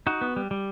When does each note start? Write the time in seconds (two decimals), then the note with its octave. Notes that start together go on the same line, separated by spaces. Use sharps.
0.07 D#4 F#4
0.21 B3
0.36 G3
0.51 G3